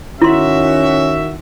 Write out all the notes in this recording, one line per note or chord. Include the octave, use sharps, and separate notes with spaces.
D#3 C#4 E4 F#4 E5 C6